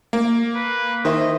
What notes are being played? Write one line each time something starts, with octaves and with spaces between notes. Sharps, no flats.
A#3
B4
D#3 E4 C5 D#5